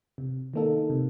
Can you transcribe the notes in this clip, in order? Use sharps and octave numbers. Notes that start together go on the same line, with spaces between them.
C3
D#3 A#3 D#4 A4
C3